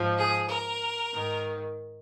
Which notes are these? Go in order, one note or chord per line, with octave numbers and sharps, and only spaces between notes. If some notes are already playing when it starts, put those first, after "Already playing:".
Already playing: G#2 F3
G#4
A#4
G#2 D#3